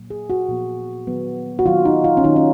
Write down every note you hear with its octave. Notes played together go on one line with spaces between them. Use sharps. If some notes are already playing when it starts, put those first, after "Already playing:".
Already playing: A#2 F#3 A#3
G#4
F#4
A#2 F3 B3
D#3 F#3 B3
F#4
D#3 F#3 A#3 F4
D#4
F4
C#4
D#3 A#3 D#4
C#4